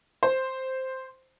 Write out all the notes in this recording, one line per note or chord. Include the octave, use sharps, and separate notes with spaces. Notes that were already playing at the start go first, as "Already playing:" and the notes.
C5